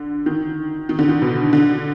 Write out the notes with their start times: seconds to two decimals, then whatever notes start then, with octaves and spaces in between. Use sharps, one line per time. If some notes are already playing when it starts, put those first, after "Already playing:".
Already playing: D3
0.26 D#3
0.89 D#3
0.99 D3
1.09 D#3
1.22 B2
1.53 D3